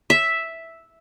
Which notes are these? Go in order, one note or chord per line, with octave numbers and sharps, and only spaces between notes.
E5